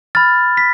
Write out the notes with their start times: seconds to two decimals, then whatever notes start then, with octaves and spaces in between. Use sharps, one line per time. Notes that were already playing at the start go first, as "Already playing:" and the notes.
0.15 B5 F6 A6
0.57 B6